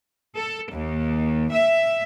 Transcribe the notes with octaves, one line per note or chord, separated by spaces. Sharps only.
A4
D#2
E5